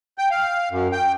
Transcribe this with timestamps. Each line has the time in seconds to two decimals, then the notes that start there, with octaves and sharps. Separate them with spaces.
0.18 G5
0.31 F5
0.71 F#2
0.92 G5